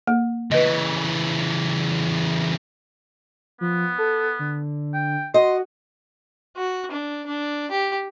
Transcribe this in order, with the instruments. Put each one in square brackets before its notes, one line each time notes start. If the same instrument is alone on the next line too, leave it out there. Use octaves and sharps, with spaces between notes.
[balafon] A#3
[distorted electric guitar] C#3 E3 [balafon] B4 D#5
[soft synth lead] F3 [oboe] B3
[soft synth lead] A4
D3
[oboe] G5
[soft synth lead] F#4 [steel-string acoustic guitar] D#5 [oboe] C6
[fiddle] F#4
D4
D4
G4